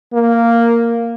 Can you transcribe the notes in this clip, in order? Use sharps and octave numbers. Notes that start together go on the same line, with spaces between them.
A#3